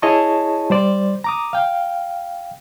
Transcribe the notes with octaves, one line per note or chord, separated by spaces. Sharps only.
E4 G#4 C#5 D#5 A5 C#6
G3 C5 D5
A#5 D6 D#6
F5 G5